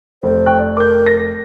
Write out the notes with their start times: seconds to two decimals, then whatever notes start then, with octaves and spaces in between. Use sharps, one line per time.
0.23 F1 F2 C5
0.46 G5 C#6 F#6
0.59 D5
0.77 A#4 D6 G6
1.06 A#6